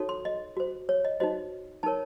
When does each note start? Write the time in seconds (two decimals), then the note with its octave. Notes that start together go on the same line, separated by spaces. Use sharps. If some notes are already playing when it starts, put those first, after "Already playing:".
Already playing: D#4 F#4 A4 C#5
0.09 C6
0.25 D#5
0.57 F#4 C5
0.89 C#5
1.05 D#5
1.20 D#4 F#4 C5 D#5
1.83 D#4 A#4 C#5 A5